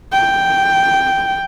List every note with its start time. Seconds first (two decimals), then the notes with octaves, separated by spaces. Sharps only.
0.13 G5